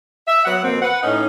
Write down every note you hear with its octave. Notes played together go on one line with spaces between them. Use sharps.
E5
F#3 B3 F#5
F2 B2 A#3 C4
B4 F#5
A2 C#4 D#4